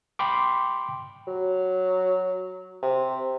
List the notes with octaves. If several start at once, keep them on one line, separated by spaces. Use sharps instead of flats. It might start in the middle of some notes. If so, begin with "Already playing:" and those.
G5 B5 C6 D6
F#3
C3